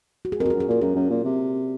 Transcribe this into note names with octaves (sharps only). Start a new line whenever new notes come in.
F#4
G#4
F2 A#4
F#4
G#4
F#2
G#4
A#2 A#4
F#2 G#4
F#2
A#2
C3